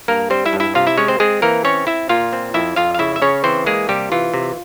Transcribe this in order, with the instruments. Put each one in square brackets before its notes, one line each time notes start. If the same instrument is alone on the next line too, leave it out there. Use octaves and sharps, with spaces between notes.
[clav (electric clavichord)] G2 A#3 A#4
G3 C4 C5
E4 E5
G2
E4 E5
C3 F4 F5
E4 E5
G#3 C#4 C#5
C4 C5
G#3 C4 G#4
E3 A#3 A#4
C4 C#4 C#5
E4 E5
A#2 F4 F5
C4
F2 E4 E5
F2 F4 F5
F5
C#3 E4 E5
E5
C#3 C#4 C#5
E3 C4 C5
G#3 A#3 G#4
C3 G3 G4
E3 F4
C3